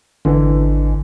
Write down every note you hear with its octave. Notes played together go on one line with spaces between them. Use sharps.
G#1 D3 E3